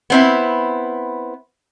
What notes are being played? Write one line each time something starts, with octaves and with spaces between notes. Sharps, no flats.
B3 C4 E4